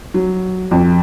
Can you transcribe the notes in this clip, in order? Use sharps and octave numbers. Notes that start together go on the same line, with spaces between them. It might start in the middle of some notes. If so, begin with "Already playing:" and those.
F#3
F2